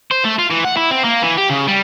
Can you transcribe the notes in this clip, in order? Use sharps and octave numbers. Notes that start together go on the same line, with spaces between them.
C5
A3
F4
E3
F#5
E4
C4
A#3
E3
G4
C#3
G3